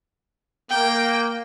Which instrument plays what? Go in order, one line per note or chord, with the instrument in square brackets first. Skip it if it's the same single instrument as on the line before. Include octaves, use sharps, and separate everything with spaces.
[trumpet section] A#3 [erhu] G5